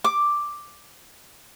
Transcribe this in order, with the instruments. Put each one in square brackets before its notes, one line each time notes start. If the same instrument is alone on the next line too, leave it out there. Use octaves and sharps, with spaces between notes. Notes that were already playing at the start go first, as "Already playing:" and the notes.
[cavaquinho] D6